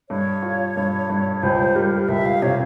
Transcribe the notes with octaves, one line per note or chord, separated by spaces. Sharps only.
G2 C#5
F4
G2
G2
C#2 C5
G3 A#4
C#2 E5
F5
C3 C#5